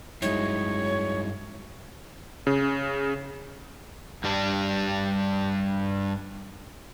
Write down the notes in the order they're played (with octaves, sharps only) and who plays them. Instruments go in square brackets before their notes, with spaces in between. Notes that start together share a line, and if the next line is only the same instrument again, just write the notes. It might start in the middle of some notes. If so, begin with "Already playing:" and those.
[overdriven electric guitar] G2 F#3 [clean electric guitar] G#3 D#4 E4 [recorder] C#5
[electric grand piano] C#3
[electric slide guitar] G2 G3 D4